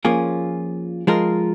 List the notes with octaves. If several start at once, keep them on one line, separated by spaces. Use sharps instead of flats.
F3 A#3 C#4 F4 G#4
F3 G#3 F4 A#4